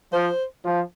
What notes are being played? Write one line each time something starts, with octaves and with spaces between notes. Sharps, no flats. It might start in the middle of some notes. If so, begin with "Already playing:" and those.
F3 C5
F3